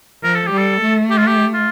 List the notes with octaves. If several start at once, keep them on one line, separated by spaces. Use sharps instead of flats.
F3 A#4
A4
G4
G3
A4
A3
G4
F4
G4
F4